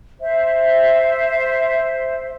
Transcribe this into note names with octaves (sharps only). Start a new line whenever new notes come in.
C5 E5